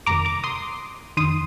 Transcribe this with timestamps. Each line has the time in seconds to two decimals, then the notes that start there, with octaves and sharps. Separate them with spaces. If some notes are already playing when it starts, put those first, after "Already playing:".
0.06 G1 F2 C3 D#3 A#5 D6
0.25 A#5 D6
0.44 C6 D#6
1.17 F2 D#3 C6 D#6